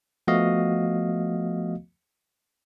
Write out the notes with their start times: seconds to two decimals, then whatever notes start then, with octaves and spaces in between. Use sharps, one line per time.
0.27 F3 A3 B3 F#4 D#5 F5